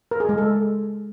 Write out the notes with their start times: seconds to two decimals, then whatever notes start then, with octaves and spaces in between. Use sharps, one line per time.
0.11 A#4
0.20 G#4
0.29 G#3
0.38 A4